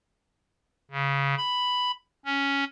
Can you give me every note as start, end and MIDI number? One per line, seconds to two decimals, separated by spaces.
0.91 1.35 49
1.38 1.92 83
2.25 2.64 61